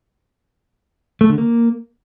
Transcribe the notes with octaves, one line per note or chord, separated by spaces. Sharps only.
A3
D3
A#3